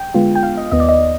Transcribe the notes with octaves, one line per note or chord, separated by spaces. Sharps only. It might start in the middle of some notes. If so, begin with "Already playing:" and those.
Already playing: G5
D3 G#3 B3 F4
G5
F5
D#5
D#2 D#3 B3 D#5
D5
D#5